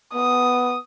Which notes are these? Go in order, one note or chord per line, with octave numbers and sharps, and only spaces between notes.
B3 D#6